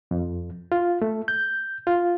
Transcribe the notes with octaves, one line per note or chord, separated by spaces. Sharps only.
F2
F4
A3
G6
F4